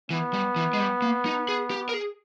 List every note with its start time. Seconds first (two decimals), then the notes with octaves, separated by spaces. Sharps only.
0.10 E3 B3
0.34 G3
0.56 E3
0.73 G#3
0.80 G3
1.02 A#3
1.26 D#4
1.49 G#4
1.70 G4
1.89 A#4
1.94 G#4